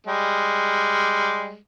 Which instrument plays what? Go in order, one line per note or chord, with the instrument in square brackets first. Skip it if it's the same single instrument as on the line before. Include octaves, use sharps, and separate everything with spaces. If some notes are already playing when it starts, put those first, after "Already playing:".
[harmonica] G3 G#3